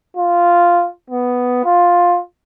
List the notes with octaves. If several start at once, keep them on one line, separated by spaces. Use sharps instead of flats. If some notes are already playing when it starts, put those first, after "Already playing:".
F4
B3
F4